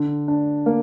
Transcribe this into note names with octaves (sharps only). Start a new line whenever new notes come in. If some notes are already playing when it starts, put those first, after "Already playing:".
Already playing: D3
D4
A#3